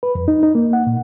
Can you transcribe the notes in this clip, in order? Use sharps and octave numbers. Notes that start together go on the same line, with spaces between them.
B4
F2
D#4
D#4
A#3
F#5
A#2